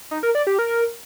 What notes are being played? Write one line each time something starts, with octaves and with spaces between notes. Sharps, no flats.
D#4
A#4
D5
G4
A#4